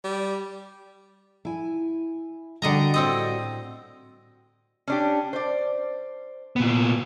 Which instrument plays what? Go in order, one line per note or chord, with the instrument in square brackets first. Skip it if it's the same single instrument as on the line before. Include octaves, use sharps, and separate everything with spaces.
[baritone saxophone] G3
[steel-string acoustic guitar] E4 G#5
[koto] D3 D#5 A#5 [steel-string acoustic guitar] G3 F#4 G5
[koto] A2 C4 D#5
[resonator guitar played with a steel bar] C#4 D4 G4
C5 D5
[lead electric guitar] A#2 B3